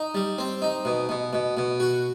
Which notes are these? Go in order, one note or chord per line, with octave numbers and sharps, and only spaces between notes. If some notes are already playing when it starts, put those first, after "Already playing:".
Already playing: D#4
G3
C4
D#4
B2
B2
B2
B2
F#4